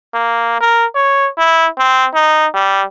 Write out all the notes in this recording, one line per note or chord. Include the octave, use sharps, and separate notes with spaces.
A#3
A#4
C#5
E4
C4
D#4
G3